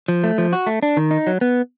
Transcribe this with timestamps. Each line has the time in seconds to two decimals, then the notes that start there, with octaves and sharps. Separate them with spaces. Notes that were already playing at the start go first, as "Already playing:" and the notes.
0.08 F3
0.24 A3
0.38 F3
0.53 F#4
0.67 A3
0.83 D4
0.97 D#3
1.11 D#4
1.27 F#3
1.41 B3